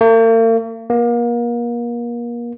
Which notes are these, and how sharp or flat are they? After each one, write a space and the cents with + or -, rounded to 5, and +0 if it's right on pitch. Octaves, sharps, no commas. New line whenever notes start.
A#3 -45
A#3 +35